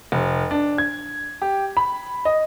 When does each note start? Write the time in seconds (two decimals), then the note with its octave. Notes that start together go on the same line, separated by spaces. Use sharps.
0.12 F1
0.51 D4
0.78 G#6
1.42 G4
1.77 B5
2.25 D#5